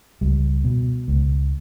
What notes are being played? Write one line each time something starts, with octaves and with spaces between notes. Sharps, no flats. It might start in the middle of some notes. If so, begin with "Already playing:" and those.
C#2 G3
B2
C#2